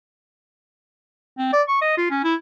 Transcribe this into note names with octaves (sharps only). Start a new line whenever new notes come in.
C4
D5
C#6
D#5
F4
C#4
E4